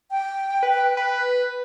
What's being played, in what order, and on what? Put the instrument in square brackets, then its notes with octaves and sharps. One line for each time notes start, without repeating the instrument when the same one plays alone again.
[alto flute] G5
[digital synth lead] B4
B4